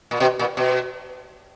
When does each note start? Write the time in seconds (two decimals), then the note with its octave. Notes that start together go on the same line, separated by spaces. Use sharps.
0.11 A#2
0.20 B2
0.39 A#2
0.57 B2